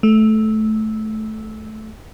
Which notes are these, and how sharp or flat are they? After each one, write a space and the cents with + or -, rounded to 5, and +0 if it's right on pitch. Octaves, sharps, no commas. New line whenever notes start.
A3 -15